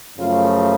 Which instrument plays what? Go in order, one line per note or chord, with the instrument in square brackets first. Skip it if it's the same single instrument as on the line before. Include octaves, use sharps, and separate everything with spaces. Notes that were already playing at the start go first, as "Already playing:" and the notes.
[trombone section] F#2 C#3 F3 A3 F4